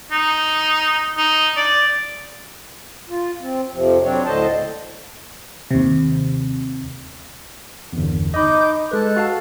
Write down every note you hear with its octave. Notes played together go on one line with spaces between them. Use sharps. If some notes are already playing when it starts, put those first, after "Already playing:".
D#4
D#4
D5
F4
C4
F2 C3 F3
F#3 C4 D4 C#5
D2 A2 D3 C5 D#5 A5
D#2 C3
G1 E2
D#4 D#5 B5 D6 G6
G#3 A4 B4 F#6
F#4 F5 A5